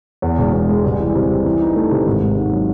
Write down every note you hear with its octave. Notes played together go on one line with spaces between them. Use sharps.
E2
E1
E2
G#3
C2
E3
C3
C2
E3
D#4
A3
C3
G#1
G#2
G#2
F#3